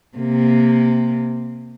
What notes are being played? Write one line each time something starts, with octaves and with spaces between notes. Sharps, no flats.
C3 A#3